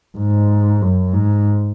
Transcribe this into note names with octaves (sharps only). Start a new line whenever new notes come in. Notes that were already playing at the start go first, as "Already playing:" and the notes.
G#2
F#2
G#2